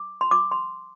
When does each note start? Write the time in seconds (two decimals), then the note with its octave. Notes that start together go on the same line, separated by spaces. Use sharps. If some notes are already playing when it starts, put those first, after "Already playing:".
Already playing: D6
0.21 C6
0.31 D6
0.51 C6